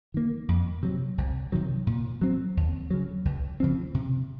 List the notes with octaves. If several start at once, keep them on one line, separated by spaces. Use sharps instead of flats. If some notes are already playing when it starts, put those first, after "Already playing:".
D#3 A#3
F2
C3 F#3
C2
C3 D#3 F#3
A#2
F#3 C4
D#2
C#3 F#3
C#2
C#3 F3 C4
C3